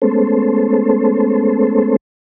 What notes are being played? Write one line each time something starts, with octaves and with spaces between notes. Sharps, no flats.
G#3 A3 B3 C#4 A4 C5